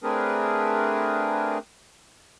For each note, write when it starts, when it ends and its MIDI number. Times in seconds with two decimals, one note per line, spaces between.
0.03 1.58 57
0.03 1.58 60
0.03 1.58 62
0.03 1.58 68
0.03 1.58 70
0.03 1.58 71